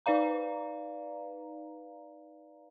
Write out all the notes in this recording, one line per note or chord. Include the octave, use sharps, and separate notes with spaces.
D#4 B4 D5 F5 A#5